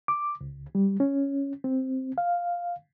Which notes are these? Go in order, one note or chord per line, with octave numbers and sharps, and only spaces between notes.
D6
C#2
G3
C#4
C4
F5